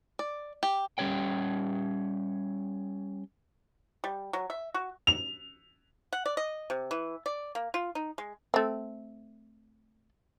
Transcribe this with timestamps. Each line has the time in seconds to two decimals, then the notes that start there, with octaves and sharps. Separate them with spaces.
0.19 D5
0.63 G4
0.98 G3 C#4 G4 C#5 G5
4.04 G3
4.33 F#3
4.50 E5
4.74 F#4
5.07 F7
6.13 F#5
6.26 D5
6.37 D#5
6.70 C3
6.91 E3
7.26 D5
7.55 A#3
7.74 F4
7.95 D#4
8.18 G#3
8.54 A3 C4